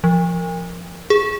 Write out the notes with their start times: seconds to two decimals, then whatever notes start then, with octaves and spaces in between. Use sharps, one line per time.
0.04 F3
1.10 G#4